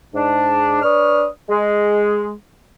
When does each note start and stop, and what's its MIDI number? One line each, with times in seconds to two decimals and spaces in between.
0.14 0.78 44
0.14 0.78 62
0.83 1.25 62
0.83 1.25 71
0.83 1.25 73
0.83 1.25 87
0.83 1.25 89
1.49 2.31 56